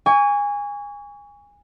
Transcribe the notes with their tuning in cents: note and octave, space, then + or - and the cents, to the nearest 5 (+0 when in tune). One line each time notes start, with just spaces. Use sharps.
G#5 -20 C#6 +30